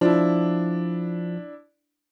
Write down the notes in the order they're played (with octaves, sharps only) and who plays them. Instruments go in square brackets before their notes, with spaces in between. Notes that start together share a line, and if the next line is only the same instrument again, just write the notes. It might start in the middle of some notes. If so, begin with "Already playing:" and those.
[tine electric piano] F3 [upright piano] D4 E4